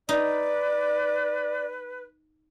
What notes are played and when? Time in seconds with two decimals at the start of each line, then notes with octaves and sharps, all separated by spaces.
0.09 D#4 B4 D5